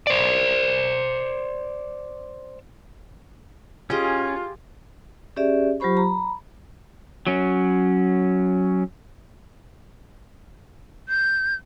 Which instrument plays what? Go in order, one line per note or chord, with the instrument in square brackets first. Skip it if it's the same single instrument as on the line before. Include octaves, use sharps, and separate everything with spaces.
[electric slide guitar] C5 D5
[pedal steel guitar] C#4 [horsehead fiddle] F4 [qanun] G4 G#4 D#5
[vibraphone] C#4 G4 G#4 D5 E5
F#3 F4 G4 C5 B5 C#6
A#5 B5
[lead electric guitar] F#3 C#4
[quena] G6